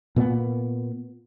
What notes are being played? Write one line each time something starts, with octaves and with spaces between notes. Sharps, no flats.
A#2 A#3 B3